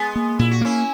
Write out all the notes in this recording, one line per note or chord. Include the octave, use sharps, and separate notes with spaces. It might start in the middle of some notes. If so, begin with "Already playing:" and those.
Already playing: G#3 B3
A#3
A#2 E4
F#4
A#3 C#4 E4